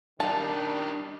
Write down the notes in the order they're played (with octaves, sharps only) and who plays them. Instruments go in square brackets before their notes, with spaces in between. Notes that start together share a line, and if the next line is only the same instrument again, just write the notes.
[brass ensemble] D#3 G3 [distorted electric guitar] D4 D#4 [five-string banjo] A5